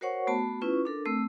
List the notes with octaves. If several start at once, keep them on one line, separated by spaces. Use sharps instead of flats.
F#4 A#4 C5 C#5 F#5 C#6
A3 B3 F#4 A5
C#4 E4 F4 B4 C#6
D4 A4 A#4
A3 C4 E6